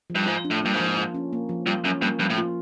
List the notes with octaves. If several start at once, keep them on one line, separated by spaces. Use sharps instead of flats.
F3
G2
G#2 F4
D4
A2
G2 A#3
G#2
F3
F4
C#4
A#3
F3
G2 F4
F#2 C#4
G2 A#3
G2 F3
A2
F4